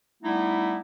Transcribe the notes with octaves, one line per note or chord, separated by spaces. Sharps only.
G3 A3 B3 D#4 E4